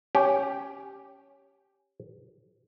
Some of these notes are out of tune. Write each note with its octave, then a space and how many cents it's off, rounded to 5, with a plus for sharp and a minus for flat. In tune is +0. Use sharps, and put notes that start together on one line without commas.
C#4 +5 G4 +0